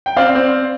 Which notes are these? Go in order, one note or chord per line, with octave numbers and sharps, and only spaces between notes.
G5
C4 D5 F5
C4